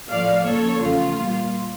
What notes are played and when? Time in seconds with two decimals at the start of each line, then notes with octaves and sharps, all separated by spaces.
0.10 A2 F3 A3 D5 F5
0.45 C#3 F3 A#3 A4 C#5
0.81 E2 C#3 F3 A3 F4
1.18 A#2 G3 A#3